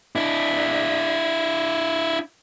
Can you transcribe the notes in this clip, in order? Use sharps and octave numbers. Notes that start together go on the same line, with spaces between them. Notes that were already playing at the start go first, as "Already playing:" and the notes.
D4 E4